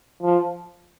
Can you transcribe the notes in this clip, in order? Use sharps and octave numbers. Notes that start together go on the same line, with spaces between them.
F3